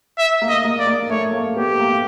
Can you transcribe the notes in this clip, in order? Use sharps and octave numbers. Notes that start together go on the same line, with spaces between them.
E5
A#3
D#5
A#3
D5
A#3
A3 C#5
A#3
B3 G4
A#3